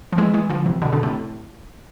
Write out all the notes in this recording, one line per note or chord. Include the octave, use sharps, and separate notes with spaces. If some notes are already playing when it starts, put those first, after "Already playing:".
F3
E3 G#3
E3 G#3
D3 F3
C3 E3
B2 D3
B2 D3
A2 C3